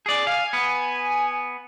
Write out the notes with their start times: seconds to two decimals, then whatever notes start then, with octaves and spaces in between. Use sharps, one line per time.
0.06 G#4 D5
0.27 F5 G#5
0.53 B3